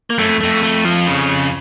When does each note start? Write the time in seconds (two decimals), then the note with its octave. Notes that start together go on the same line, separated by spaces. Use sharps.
0.10 A#3
0.19 F#2 A3
0.27 F2
0.41 F2 A3
0.63 A3
0.85 F3
1.07 C#3